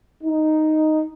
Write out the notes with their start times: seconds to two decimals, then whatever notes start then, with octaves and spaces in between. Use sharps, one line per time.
0.23 D#4